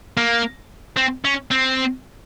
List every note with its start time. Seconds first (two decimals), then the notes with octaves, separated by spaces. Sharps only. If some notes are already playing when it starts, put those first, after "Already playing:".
0.17 A#3
0.97 C4
1.25 C#4
1.51 C4